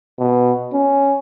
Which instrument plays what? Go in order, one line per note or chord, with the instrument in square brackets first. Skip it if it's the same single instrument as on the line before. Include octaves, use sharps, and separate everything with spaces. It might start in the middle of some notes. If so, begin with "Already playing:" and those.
[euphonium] B2
C#4